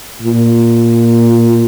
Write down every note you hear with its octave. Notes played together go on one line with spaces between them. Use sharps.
A#2